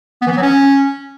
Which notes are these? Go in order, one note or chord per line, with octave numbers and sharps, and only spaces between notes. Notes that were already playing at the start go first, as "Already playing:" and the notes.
B3
E3
B3
F#3
C#4